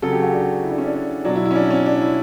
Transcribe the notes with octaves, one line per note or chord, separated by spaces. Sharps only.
C#3 F#3 A4
G4
F#4
D4
E4
D4
C#4
D4
B2 F#3 D4
E4
E4
C#4
D4
C#4
D4
E4